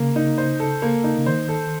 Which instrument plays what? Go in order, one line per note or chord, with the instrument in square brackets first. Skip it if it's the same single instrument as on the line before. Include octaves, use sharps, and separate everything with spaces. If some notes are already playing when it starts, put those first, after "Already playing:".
Already playing: [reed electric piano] C#3 [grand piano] A#3
[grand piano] D#4
C5
A4
A#3
D#4
[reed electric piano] C#3
[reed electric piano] D#3 [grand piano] C5
[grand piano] A4